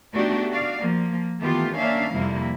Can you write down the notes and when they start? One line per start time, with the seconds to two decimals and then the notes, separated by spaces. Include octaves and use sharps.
0.14 A3 B3 D4 D#4 F#4 G4
0.50 F#4 D5 F5
0.79 F3 A#3
1.39 D#3 E3 A3 B3 F4 G4
1.77 A#3 C#4 D4 E5 F5
2.13 F2 C3 G3 A#3 E4